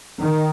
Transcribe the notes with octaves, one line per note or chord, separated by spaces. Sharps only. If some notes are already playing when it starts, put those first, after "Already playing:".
D#3